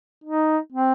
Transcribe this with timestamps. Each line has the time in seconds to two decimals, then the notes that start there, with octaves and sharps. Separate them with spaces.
0.24 D#4
0.72 C4